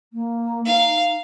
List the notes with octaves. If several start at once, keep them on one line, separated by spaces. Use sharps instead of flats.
A#3
D#4 F5